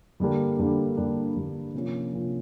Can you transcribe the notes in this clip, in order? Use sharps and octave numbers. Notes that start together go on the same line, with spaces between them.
G2 D3 G3 A#3 D4
G2 D3 G3 A#3 D4
G2 D3 G3 A#3 D4
G2 D3 G3 A#3 D4
C3 F3 A#3 C#4 F4
C3 F3 A#3 C#4 F4